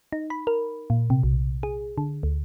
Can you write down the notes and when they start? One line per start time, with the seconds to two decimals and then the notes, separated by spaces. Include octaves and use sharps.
0.12 D#4
0.30 B5
0.47 A#4
0.90 A#2
1.10 C3
1.23 B1
1.63 G#4
1.98 D3
2.23 D2